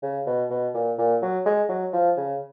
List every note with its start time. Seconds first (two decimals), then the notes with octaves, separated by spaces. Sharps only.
0.03 C#3
0.27 B2
0.50 B2
0.74 A#2
0.98 A#2
1.22 F#3
1.46 G#3
1.69 F#3
1.93 F3
2.17 C#3